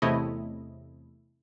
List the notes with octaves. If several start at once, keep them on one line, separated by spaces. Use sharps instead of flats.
E2 C3 A3 E4 C#5 D#5